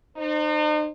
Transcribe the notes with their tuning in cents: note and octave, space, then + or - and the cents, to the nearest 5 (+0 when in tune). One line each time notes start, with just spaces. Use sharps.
D#4 -40 C5 +0